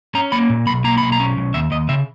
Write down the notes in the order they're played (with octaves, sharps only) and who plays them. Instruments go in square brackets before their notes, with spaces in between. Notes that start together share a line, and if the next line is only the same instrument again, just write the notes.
[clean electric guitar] C#4 A#5
A#3 B5
A#2
B1 B5
A#3 A#5
B1 B5
A#5
C#4
B1
D#2 E5
D#2 D#5
C#3 E5